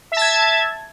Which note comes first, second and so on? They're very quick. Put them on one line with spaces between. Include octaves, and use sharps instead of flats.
E5 A5 G#6